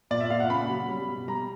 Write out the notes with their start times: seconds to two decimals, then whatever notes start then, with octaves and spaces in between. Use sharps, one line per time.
0.11 A#2 D5
0.20 E5
0.30 A#2 F5
0.40 F#5
0.50 C#3 B5
0.69 F#3
0.89 G3
1.08 B2
1.28 G3 A#5